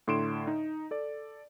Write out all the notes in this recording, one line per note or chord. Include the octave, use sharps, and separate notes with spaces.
A2 D3 C6 D7 E7
D#4
A4 D5